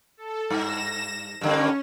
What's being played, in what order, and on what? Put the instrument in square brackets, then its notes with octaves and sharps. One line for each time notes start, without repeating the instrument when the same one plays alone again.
[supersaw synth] A4
[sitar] G2 [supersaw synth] A#6 E7
[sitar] G2 D3 A#3 [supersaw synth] C#4